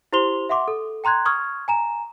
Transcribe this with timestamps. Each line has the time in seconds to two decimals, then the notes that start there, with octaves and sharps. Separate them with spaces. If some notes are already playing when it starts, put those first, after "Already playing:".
0.13 E4 G4 C5 C6 F7 G7
0.49 E5 F#5 C6 D6
0.68 A4
1.04 G5 A#5 C6 F#6 G#6
1.25 C#6 D#6 F6 G#6
1.68 G#5 A#5 E7